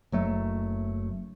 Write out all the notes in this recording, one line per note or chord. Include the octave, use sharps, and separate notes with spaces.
F#1 F#3 A3